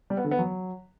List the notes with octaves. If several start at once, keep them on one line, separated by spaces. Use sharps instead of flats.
G3
B3
D3
B3
F#3